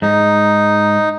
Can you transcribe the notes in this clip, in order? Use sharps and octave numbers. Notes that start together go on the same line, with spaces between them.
G#2 D#4